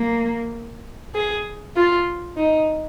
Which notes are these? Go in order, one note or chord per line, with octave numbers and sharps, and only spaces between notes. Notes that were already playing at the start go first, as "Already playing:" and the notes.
Already playing: A#3
G#4
F4
D#4